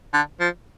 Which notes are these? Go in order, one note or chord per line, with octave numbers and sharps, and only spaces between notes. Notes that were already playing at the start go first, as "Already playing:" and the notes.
D3
F3